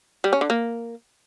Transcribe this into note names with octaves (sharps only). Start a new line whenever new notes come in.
G3
C#4
D3
A#3